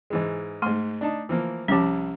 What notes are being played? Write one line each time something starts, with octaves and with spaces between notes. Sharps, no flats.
G#2 E3 G#3
G#2 A3 C6
D4 D#4 A5
E3 F3 A#3
C2 F3 G3 C#4 A5